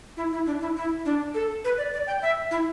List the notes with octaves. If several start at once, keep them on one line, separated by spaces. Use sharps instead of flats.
E4
E4
D4
E4
E4
D4
A4
B4
D5
D5
G5
E5
E4